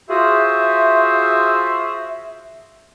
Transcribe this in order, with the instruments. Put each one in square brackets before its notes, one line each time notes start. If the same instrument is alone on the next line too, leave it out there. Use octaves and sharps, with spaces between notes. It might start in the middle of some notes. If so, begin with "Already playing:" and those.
[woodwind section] F4 F#4 G#4 C5 E5